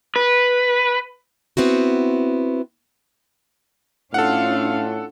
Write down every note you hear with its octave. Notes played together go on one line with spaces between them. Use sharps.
B4
B3 C4 E4 F#4
A2 C#4 D4 F4 A4 F5 F#5